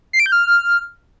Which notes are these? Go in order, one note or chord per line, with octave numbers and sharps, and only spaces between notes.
C7
D7
G6
F6